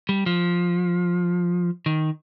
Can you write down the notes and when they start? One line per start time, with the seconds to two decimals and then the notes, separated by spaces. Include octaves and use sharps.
0.09 G3
0.26 F3
1.86 D#3